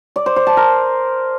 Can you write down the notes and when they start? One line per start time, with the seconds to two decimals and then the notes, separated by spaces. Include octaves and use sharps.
0.16 D5
0.26 C5
0.36 C5
0.47 A5
0.57 A#4